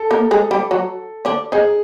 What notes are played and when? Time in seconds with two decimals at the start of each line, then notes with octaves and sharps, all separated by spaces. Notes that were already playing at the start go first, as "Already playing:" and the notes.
Already playing: A4
0.11 A#3 A#4
0.31 G#3 G#4
0.51 G3 G4
0.71 F#3 F#4
1.25 D3 D4
1.52 D#3 D#4 G#4